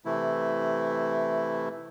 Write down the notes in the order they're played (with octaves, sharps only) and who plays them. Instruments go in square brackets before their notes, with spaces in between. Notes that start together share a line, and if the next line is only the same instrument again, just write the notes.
[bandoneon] C3 E3 A3 E4